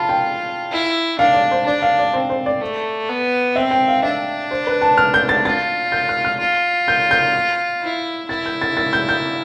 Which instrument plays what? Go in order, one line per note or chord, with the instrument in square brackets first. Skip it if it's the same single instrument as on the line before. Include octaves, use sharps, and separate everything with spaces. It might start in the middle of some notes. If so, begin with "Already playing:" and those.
Already playing: [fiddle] F4 [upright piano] A5 B5
[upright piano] G5
[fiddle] E4
[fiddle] D4 [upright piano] F5
[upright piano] D5
C5
[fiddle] D4 [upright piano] D5
[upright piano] F5
D5
[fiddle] C4 [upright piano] C5
[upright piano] C5
D5
[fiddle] A3
B3
[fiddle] C4 [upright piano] E5
[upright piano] G5
F5
[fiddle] D4 [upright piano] E5
[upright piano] C5
B4
A5
F6
G6
A6
[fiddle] F4 [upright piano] A6
[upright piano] G6
F6
F6
[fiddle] F4
[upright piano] G6
G6
[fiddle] E4
[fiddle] E4 [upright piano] A6
[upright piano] G6
A6
A6
G6
G6